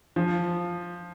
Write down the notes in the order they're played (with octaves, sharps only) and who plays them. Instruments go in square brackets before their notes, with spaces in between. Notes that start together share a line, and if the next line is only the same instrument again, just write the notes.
[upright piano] F3